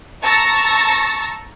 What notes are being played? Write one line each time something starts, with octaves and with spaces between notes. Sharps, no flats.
A5 A#5 C#6 E6 A6 A#6